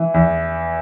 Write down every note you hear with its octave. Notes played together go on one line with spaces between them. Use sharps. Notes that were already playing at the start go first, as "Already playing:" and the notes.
Already playing: E3
E2